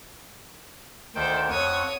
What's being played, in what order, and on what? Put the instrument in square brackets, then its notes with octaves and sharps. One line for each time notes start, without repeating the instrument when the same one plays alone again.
[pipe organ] D2 D#3 G5 [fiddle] A4 C5
[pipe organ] F2 F#5 C#6 [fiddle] C#5 D#6